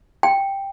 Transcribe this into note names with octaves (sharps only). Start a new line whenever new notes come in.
G5